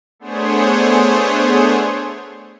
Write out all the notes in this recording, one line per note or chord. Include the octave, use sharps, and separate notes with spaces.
A3 B3 D4 G#4 C5 C#5